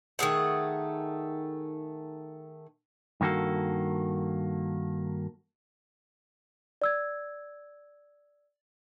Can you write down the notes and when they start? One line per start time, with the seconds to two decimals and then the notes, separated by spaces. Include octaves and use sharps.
0.19 D#3 A3 G#4 F#5
3.21 G2 D#3 A#3 F#4 A4
6.82 D5 E6 G#6